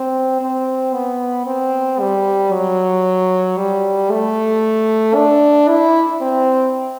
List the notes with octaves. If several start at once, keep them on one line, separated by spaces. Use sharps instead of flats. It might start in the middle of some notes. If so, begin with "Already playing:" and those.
Already playing: C4
C4
B3
C4
G3
F#3
G3
A3
D4
E4
C4